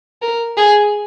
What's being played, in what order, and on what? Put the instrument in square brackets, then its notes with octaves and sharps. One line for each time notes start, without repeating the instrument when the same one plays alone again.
[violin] A#4
G#4